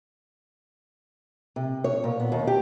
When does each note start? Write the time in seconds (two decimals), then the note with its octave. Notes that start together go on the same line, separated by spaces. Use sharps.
1.56 C3
1.84 C#5
2.04 A#2
2.20 B3
2.32 D#2
2.47 G4